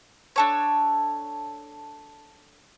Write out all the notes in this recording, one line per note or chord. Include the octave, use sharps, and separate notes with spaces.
D4 A4 C#5